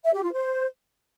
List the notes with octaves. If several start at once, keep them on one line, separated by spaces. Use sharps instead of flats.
E5
G4
F4
C5